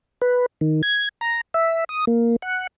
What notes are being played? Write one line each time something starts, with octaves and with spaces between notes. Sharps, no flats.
B4
D#3
G#6
A#5
E5
D#6
A#3
F#5